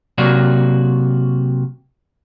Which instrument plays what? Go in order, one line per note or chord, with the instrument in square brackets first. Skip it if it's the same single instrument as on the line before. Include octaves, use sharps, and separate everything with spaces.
[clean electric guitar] C3 F#3 A#3 F#4 D5